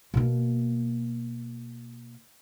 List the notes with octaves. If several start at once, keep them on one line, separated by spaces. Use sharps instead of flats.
B2 A#3